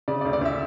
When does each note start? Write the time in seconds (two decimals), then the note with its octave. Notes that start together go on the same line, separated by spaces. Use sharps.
0.08 C#3 D5
0.21 D5
0.25 D2
0.33 D5
0.41 D2 E5